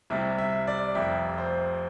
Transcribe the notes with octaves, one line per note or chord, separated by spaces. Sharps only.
C2 C3 G3 E5
E5
D5
F1 F2 C3 E5
C5